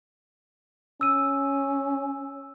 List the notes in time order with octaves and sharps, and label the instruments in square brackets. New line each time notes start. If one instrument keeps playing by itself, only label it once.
[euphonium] C#4 [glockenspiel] E6 D#7